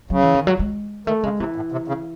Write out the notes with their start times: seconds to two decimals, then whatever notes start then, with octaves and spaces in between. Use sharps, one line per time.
0.10 C#3 F#3
0.22 E3
0.34 D#3
0.47 F#3
0.59 G#3
1.07 D#3 A3
1.24 C#3 G#3
1.39 C3 E3
1.56 A2
1.72 C3
1.88 C#3